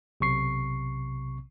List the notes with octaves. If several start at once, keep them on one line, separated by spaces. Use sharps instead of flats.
B1 C3 C#6 C7